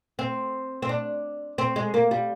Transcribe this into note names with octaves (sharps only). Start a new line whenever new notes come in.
C4
C4
D4
C4
G#3
A#3
G3